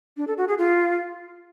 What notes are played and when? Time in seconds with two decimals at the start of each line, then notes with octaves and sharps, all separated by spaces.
0.17 D4
0.27 A4
0.38 F#4
0.48 G#4
0.58 F4